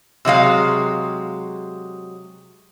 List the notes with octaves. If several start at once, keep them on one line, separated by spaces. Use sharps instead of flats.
C3 F#3 G#3 F5